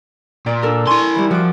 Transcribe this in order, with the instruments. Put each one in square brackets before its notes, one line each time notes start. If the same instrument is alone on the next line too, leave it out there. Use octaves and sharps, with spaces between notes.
[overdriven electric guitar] A#2 [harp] D5
[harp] D4 A4 A#4
[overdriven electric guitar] E4 C6 [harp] G#5 C#6
[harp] E3 G3
[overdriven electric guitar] F3 [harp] F#4 D6